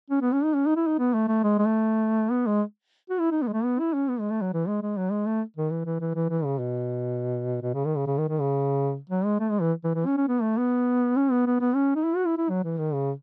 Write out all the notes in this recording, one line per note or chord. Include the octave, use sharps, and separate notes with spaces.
C#4
B3
C#4
D#4
C#4
D#4
E4
D#4
B3
A3
A3
G#3
G#3
A3
B3
G#3
F#4
E4
D#4
B3
G#3
A3
B3
E4
C#4
B3
G#3
A3
F#3
E3
G#3
G#3
F#3
G#3
A3
D#3
E3
E3
E3
E3
E3
C#3
B2
B2
C#3
D#3
C#3
C#3
D#3
D#3
C#3
F#3
G#3
A3
G#3
E3
E3
E3
C#4
C#4
B3
A3
B3
C#4
B3
B3
B3
C#4
D#4
E4
F#4
E4
E4
F#3
E3
D#3
C#3